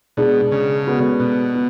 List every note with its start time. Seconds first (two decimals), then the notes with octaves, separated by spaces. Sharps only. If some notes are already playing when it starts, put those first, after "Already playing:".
0.17 B2 G#3 D4 G#4 D5
0.52 C#3
0.85 G#3 B3 F#4 A4 D5
1.20 B2
1.54 B3